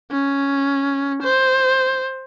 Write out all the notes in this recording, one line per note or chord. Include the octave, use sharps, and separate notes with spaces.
C#4
C5